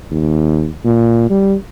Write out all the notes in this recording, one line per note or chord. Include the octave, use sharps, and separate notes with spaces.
D#2
A#2
G3